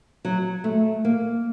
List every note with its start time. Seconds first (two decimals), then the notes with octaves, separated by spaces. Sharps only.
0.25 F#3
0.64 A3
1.05 A#3